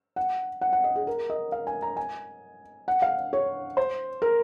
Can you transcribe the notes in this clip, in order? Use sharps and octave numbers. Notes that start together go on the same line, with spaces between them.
F#5
F#5
F#5
D#5
G#4
A#4
D#5
F5
G#5
A#5
G#5
F#5
F5
C#5
C5
A#4